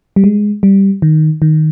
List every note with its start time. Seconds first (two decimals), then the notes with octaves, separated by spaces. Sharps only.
0.16 G3
0.24 G#3
0.63 G3
1.02 D#3
1.42 D#3